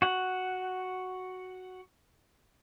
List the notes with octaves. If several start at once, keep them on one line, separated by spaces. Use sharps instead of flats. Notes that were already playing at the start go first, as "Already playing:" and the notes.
F#4 F#5